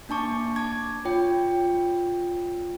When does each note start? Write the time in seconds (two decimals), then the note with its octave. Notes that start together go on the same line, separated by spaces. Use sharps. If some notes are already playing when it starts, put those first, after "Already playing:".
0.09 A#3 D4 A5 C#6 D6
0.56 A5 D6 G#6
1.05 F4 C#5 G5